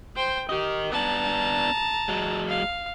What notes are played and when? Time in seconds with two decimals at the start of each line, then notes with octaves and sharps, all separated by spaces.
0.16 C5 G5
0.49 G4 A#4 D#5
0.92 B3 D4 A5 A#5
2.09 F#3 G#3
2.49 F5